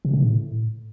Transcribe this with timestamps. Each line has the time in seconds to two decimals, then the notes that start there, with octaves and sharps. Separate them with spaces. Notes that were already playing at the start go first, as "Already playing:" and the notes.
0.05 C3
0.13 C#3
0.22 A2